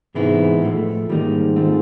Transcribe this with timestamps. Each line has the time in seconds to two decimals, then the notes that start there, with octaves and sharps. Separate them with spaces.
0.15 G#2 C3 E3 G#3 B3 E4
0.62 A2 F3 A3
1.09 G#2 D#3 G3 A#3 D#4
1.56 A3 C4 F4